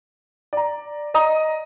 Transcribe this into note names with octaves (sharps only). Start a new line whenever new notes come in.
D5 A#5
D5 D#5 A#5 D#6